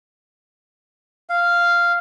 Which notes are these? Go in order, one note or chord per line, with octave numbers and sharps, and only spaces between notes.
F5